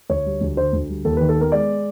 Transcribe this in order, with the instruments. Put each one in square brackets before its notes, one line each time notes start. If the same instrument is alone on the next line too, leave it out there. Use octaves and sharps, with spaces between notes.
[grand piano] D2 C#5
G3
D2
D3 C5
D2
G3
D#2 A4
B4
D#3
A4
B3 A#4
G#3 D5